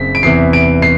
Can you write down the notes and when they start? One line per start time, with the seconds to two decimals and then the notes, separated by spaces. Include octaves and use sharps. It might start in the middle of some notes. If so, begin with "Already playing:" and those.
Already playing: F#1 C4 B6
0.15 D7
0.23 E2 C3 E3 C7
0.53 D7
0.82 C7